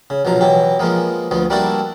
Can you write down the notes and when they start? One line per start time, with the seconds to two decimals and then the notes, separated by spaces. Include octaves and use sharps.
0.10 C#3
0.25 A#1 B2 F3 F#3 A#5
0.41 B2 E3 F#3 G4
0.79 F3 G#3 A#3 B3
1.31 D2 F3 B3
1.50 G3 A#3 D4 E4 F#4 A4